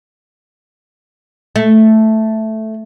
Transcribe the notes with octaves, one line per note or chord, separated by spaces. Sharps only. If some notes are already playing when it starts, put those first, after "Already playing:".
A3